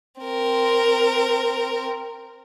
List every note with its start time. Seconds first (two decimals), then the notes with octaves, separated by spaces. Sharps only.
0.21 C4 A#4